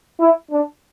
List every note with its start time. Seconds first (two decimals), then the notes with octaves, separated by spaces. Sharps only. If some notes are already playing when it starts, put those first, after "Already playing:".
0.20 E4
0.51 D4